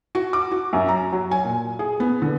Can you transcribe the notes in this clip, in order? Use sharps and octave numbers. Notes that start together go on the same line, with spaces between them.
F#4
D6
F#4
F#2
A#5
F#3
G#5
A#2
G#4
B3
D3